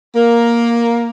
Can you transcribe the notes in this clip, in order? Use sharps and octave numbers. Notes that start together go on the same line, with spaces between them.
A#3